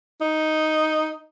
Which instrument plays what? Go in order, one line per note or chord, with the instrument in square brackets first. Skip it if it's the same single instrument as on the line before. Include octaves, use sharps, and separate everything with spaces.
[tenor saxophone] D#4